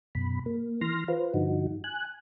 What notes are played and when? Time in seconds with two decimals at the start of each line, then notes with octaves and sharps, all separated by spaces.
0.15 F#2 B2 B5
0.46 A#3
0.81 E3 C6 F6 A#6
1.08 F4 B4 C5
1.34 G2 D3 F3 D#4 F#4
1.84 G#5 F#6